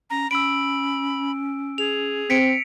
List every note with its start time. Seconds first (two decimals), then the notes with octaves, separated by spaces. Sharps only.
0.10 C#4 A#5
0.31 C#4 B5 E6 D7
1.78 G#4 F7
2.30 C4 B6 C#7 D7